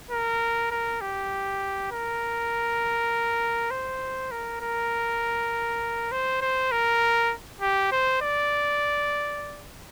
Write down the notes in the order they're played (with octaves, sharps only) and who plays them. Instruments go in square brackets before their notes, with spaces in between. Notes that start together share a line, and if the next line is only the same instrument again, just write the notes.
[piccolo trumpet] A#4
A#4
G4
A#4
C5
A#4
A#4
C5
C5
A#4
G4
C5
D5